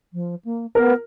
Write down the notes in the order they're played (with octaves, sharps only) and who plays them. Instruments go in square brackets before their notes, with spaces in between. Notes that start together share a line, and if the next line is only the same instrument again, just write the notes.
[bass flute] F3
A#3
[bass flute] B3 [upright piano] A#4